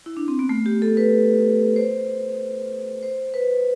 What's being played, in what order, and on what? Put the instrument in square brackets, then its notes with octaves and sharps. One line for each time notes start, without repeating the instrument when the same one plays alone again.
[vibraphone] E4
D4
C4
B3
A3
G4
A4
B4
C5
C5
B4